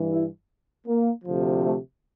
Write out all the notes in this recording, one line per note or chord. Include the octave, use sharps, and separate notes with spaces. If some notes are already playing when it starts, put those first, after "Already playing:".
Already playing: G2 E3
E4
A#3
D2 C3 F3
A3